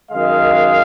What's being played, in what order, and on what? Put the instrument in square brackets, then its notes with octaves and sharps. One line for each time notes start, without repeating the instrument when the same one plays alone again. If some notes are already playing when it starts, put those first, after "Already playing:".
[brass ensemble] F#2 D#3 G#3 D#5 F5